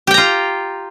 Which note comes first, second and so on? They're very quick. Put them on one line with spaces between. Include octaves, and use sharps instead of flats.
G4 G5 A#5 F4